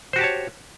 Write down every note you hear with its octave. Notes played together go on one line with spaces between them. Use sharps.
F#4 G4 C5 C#5 A5